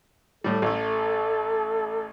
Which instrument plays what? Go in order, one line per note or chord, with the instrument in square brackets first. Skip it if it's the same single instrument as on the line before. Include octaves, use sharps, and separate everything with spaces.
[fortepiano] A2 G3 [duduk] A4
[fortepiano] A1 A3